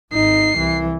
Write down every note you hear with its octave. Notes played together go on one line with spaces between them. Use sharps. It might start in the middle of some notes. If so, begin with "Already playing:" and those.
G#1 D#4 C7
C2 E3